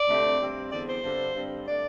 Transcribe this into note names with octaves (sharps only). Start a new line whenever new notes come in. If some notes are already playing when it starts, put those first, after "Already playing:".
Already playing: D5
D2 C3 A3 C4
G2 G3 C4
E2 D3 C4 D5
C5
G2 D3 G3 C4
G2 D3 G3 C4
A2 A3 D4 D5